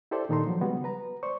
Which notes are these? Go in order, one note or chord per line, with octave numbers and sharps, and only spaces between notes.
E4 G4 A4 C5 D5 E5
A#2 D#3 D#4 A4 A#5 C6
F3 F#3
C#3 G3 G#3 B3 F#4
B4 A#5
C5 D5 C#6